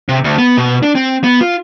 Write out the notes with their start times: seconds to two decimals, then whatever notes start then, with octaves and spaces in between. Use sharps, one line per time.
0.09 C3
0.24 D2
0.38 B3
0.58 B2
0.83 D4
0.95 C4
1.24 B3
1.41 F4